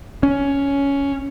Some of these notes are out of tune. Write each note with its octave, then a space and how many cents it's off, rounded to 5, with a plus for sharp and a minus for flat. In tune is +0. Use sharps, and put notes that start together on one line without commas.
C#4 +10